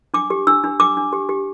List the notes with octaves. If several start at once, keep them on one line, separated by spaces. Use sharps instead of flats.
D4 D6
G4
D4 E6
D4
D4 D6
D4
G4
G4